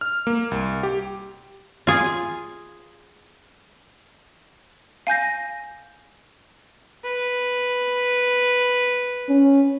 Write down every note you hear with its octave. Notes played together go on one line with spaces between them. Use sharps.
F6
A#3
C2
G4
F4 G#4
F5 G#5 G6 A#6
B4
C#4